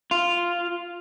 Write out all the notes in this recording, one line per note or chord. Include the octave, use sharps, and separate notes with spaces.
F4